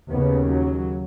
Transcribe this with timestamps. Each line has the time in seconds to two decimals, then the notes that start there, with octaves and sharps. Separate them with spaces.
0.10 D#2 C#3 B3
0.49 F#3